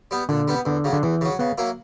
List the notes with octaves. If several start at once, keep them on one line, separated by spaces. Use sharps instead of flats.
G3 B3
A#2 D3
G3 B3
E2 D3
C#3 F#3
D3
E2 E3
C#3 F#3
C#3 B3
F#3 A#3 E4